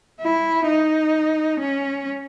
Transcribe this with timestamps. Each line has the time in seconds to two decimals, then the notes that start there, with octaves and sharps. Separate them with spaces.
0.21 E4
0.67 D#4
1.60 C#4